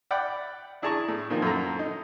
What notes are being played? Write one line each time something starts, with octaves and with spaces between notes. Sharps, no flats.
D5 F#5 G5 B5
D4 E4 G#4 A5 A#5 C#6
A2
A#2 D#3 F3 A#3
F#2 A3 A4 A#5
D#4